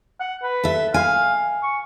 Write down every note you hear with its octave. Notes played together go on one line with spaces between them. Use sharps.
F#5
B4
A4 E5
F5 G#5
C#6